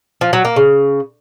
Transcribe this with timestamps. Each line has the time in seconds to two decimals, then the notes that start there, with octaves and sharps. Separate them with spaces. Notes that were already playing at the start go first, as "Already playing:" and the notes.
0.21 F3
0.33 F#3
0.45 A#3
0.56 C#3